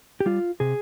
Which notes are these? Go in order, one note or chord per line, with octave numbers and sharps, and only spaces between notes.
G4
G3 F4
C3 G#4